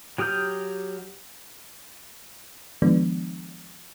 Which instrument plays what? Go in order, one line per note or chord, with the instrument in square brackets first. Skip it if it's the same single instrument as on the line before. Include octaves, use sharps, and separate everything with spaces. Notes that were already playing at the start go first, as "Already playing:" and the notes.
[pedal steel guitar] F#3 G4 D#6 F6 G6
[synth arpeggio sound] D#3 F3 G#3 B3 D4